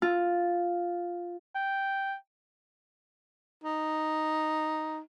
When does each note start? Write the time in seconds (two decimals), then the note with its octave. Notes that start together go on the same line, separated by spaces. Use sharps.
0.02 F4
1.55 G5
3.64 D#4